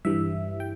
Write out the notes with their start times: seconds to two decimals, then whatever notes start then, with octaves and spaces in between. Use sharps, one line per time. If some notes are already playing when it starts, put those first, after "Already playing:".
0.05 G2 E3 G3 E5
0.60 G5